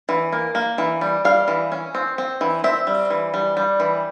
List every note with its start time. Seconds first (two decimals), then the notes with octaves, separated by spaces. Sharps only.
0.09 E3
0.32 A#3
0.55 A#3
0.78 E3
1.01 G3
1.25 G3 F5
1.48 E3
1.72 C#4
1.95 C4
2.18 C4
2.41 E3
2.64 C4 E5
2.87 G3
3.10 E3
3.34 G3
3.57 G3
3.80 E3